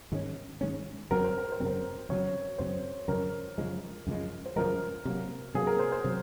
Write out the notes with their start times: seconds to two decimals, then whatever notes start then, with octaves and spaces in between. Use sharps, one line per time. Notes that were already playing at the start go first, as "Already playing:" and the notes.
0.12 G#2 D#3 G#3 C#4
0.61 G#2 D#3 G#3 C#4
1.11 F#2 C#3 F#3 C4 A#4
1.24 C5
1.38 A#4
1.52 C5
1.60 F#2 C#3 F#3 C4 A#4
2.09 F#2 C#3 F#3 C4 C#5
2.58 F#2 C#3 F#3 C4 C5
3.08 F#2 C#3 F3 G#3 A#4
3.58 F#2 C#3 F3 G#3
4.07 F#2 C#3 F3 G#3
4.46 C5
4.56 F#2 C#3 F3 G#3 A#4
5.05 C3 F#3 A#3
5.54 C3 F#3 A#3 G#4
5.67 A#4
5.79 C5
5.92 C5
6.04 C3 F#3